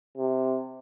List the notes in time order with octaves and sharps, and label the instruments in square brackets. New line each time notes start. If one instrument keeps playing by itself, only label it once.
[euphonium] C3